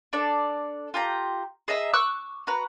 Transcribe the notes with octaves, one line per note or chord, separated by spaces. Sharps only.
D4 A4 D5
F4 G4 G5 A#5
G#4 D#5 E5 A#5
C#6 D6 E6 F#6
F#4 B4 A#5